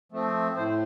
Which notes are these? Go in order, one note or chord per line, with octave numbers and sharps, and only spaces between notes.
F3 A3 C4
A2 C5